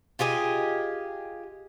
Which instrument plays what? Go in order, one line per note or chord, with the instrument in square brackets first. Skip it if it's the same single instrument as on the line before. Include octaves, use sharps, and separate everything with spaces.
[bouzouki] F4 G4 G#4 D#5